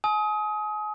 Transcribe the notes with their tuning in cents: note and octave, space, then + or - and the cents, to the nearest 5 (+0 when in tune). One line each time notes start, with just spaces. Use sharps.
G#5 +35 D#6 +25